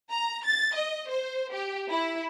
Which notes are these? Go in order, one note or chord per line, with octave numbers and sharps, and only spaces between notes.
A#5
A6
D#5
C5
G4
E4